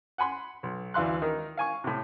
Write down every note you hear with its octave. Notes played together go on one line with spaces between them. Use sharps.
F#5 G#5 B5 C6
B1
D2 E3 F5 C6 F#6
D#3 D#4 A#4
F5 G#5 C#6
A2 C3